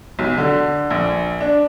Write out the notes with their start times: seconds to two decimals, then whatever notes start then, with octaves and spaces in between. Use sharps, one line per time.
0.19 B1
0.38 D3
0.90 A#1
1.41 D4